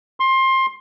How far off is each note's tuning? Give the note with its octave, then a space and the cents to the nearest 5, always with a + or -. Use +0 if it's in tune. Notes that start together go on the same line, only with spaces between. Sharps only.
C6 +20